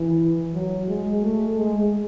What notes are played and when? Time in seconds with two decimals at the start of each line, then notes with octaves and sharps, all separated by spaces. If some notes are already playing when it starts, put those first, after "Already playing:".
Already playing: E3
0.54 F#3
0.88 G#3
1.22 A3
1.57 G#3